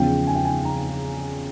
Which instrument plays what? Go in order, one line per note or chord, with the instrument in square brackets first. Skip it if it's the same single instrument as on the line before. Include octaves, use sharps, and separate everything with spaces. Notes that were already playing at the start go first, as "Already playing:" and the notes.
Already playing: [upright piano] E2 C#3 F3 G5
G#5
G5
G#5
A#5